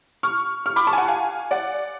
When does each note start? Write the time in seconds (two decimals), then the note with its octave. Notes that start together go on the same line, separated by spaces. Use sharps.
0.23 C#6 F6
0.66 C#6 F6
0.76 B5 D6
0.87 A5 C#6
0.93 G#5
0.97 F#5 A5
1.08 F5 G#5
1.51 D5 F#5